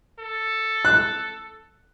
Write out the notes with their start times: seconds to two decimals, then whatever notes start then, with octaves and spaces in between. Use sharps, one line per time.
0.19 A4
0.85 F#6